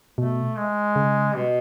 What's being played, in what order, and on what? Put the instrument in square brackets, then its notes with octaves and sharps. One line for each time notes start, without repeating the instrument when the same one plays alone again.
[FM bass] B2 [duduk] A3
[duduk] G#3
[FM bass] C#3
[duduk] B2